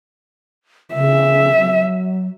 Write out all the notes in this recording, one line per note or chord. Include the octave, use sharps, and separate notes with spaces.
C#3 E5
F#3